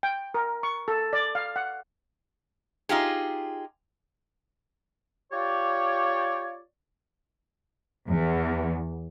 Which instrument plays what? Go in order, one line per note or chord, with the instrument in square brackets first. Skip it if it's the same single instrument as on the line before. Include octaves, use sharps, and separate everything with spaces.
[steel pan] G5
A#4
C#6
A4
D5
F5
F#5
[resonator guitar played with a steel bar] D#4 F4 G4 G#4
[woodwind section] F4 G4 C#5 D5
[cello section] E2